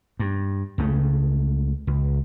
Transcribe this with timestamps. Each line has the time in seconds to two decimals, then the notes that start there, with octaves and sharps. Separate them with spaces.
0.20 G2
0.78 C#2 C#3 A3
1.87 C#2